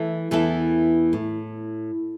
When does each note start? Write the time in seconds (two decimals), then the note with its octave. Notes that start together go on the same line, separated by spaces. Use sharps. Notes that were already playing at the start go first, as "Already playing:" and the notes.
Already playing: E3 A3 E4 A4
0.31 E2 E3 B3 E4 A4
1.13 A2